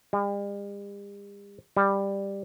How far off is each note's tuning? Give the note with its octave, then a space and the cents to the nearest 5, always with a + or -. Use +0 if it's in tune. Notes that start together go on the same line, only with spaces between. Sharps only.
G3 +45
G3 +10